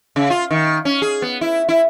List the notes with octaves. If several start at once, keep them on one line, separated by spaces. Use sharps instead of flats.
C#3
F4
D#3
C#4
G#4
B3
E4
E4